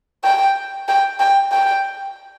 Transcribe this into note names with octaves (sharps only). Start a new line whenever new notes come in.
G5
G5
G5
G5